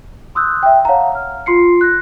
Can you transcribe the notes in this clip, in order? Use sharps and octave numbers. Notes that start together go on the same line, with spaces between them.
C6 D#6 E6 F#6 G6
E5 G5
C#5 F5 F#5 A5 A#5
F6
F4 C6 C7 C#7
F#6 A#6